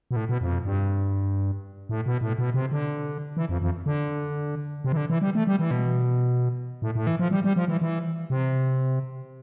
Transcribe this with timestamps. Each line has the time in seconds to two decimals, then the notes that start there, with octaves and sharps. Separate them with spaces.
0.11 B2
0.16 A2
0.29 B2
0.41 F2
0.65 G2
1.89 A2
2.06 B2
2.21 A2
2.38 B2
2.54 C3
2.72 D3
3.37 E3
3.49 F2
3.62 F2
3.86 D3
4.84 C3
4.92 E3
4.97 D3
5.10 E3
5.22 G3
5.35 A3
5.47 G3
5.59 E3
5.71 B2
6.82 A2
6.95 A2
7.07 E3
7.19 F3
7.31 G3
7.44 G3
7.56 F3
7.68 E3
7.81 E3
8.30 C3